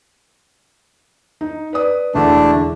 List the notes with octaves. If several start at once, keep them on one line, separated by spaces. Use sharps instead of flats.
D#4
B4 D5 D#6
E1 D3 A3 D4 E4 E5